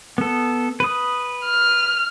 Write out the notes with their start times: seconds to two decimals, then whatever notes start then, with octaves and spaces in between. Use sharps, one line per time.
0.18 B3 A4
0.80 B4 D#6
1.45 F6